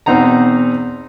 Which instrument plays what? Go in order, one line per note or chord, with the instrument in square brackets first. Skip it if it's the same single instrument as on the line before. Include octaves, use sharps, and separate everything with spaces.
[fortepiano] E2 B2 C4 D#4 F#5 A#5